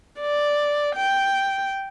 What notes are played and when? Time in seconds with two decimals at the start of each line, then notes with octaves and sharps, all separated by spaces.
0.20 D5
0.96 G5